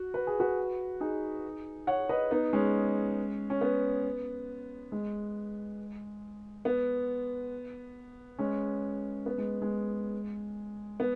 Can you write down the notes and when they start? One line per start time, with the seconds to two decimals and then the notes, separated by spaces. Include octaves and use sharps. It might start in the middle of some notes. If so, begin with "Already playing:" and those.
Already playing: F#4
0.14 B4
0.27 G#4
0.40 F#4 B4
1.01 D#4 G#4
1.87 C#5 F#5
2.09 B4 D#5
2.31 B3 D#4
2.53 G#3 C#4
3.50 C#4
3.61 B3
4.92 G#3
6.65 B3
8.39 G#3 C#4
9.26 B3
9.38 G#3
9.62 G#3
11.00 B3